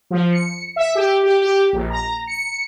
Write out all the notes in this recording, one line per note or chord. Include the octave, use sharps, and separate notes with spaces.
F3
C#7
E5
G4
G4
G4
A#1
A#5
C#7